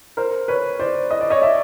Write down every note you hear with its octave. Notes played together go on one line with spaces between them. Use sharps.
A#4 C5
B4 C#5
C5 D5
D#5
D5
C#5 D#5
D5 E5